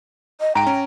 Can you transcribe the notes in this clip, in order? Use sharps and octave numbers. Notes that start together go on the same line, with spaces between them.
D#5
G#2 G5 A#5 D7
C#4